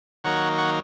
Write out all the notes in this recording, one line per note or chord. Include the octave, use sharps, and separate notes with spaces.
D#3 F#3 A#3 D#4 C#5 F#5
C#5 F#5